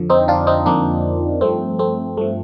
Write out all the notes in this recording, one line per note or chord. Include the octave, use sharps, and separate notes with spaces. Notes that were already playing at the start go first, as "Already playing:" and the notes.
Already playing: F2 D3 F3
C4 D#4
D4 F4
C4 D#4
F2 D3 F3 A#3 D4
G2 F3 A3 C4
A3 C4
G2 F3 A3